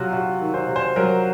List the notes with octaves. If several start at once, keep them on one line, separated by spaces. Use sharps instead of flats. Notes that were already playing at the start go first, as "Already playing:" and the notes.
Already playing: C3 F#3 F4 F#4
C3 F#4
D#3
C5
C3
C5
F#3 A#4